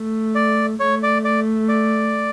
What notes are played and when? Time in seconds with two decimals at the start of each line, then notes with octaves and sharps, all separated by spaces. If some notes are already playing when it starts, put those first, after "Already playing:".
Already playing: A3
0.35 D5
0.80 A3 C#5
1.03 D5
1.25 D5
1.69 D5